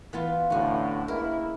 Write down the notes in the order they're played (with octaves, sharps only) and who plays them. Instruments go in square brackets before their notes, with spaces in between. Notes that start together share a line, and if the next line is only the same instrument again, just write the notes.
[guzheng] E3 B3 F4
[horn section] A2 D3 [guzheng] C#4 F#4
[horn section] G#3 A#3 E4 [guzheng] A#4